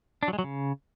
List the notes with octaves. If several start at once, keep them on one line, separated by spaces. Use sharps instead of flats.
D4
F#3
G#3
F#3
C#3